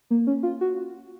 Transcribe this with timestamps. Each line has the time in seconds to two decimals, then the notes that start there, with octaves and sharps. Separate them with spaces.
0.11 A#3
0.27 C#4
0.43 F4
0.61 F#4